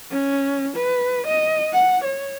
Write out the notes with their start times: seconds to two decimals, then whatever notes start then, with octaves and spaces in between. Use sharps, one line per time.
0.11 C#4
0.76 B4
1.27 D#5
1.73 F#5
2.04 C#5